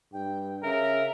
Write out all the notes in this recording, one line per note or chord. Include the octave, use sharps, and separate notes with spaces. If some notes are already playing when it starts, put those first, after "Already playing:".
G2 G5
C#3 A#4 E5